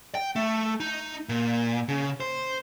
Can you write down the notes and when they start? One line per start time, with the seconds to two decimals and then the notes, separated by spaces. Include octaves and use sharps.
0.15 G5
0.36 A3
0.80 D#4
1.29 A#2
1.89 C#3
2.20 C5